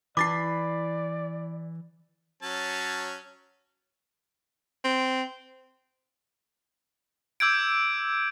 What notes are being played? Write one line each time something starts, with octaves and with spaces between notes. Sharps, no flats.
E3 E4 D5 B5 D6 A6 C7
F#3 C#4 A5
C4
D6 E6 G6 G#6 D7